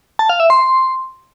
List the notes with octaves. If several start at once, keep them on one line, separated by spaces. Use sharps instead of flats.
A5
F5
E5
C6